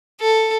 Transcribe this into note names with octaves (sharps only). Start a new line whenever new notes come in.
A4